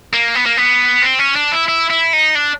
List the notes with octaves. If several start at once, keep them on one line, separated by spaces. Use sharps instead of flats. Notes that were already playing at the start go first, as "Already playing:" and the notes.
A#3
B3
A#3
B3
C4
C#4
D4
E4
E4
E4
D#4
D4